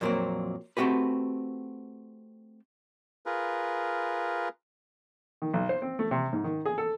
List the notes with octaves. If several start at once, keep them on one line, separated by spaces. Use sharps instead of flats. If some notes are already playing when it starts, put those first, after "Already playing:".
F2 A#2 F#3 A3 A#3 C4
A3 C4 F#4 G4 B4
F4 G#4 A#4 B4
D#3
B1
C5
C4
A3
C3
G#2
D#3
G#4
A4